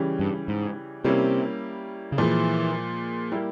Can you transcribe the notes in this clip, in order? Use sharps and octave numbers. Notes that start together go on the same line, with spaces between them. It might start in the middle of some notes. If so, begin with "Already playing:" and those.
Already playing: C#3 E3 G3 C#4 G4
G2
G#2
C3 G3 A#3 C#4 E4
C#3
A#2 E3 F3 G#3
G3 A#3 E4 G4